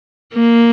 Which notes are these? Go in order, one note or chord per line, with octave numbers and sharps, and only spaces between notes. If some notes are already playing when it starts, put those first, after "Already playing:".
A#3